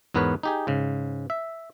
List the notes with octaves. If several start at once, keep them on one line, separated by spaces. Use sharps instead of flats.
E2 G#2 B3 A#4 B4 C#5
D#4 G4 G#4
G#2 C#3
E5